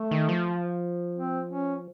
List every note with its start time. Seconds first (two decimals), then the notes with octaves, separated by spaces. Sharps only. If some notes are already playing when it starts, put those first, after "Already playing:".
Already playing: A3
0.11 D#3
0.29 F3
1.15 C4
1.49 C#4